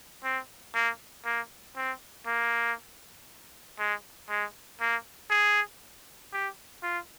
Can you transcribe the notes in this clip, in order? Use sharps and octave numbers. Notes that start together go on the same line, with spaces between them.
C4
A#3
A#3
C4
A#3
G#3
G#3
A#3
G#4
G4
F4